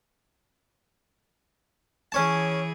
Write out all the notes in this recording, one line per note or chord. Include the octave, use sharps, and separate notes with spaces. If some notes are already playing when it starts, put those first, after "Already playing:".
E3 C#4 G#4 C#5 A5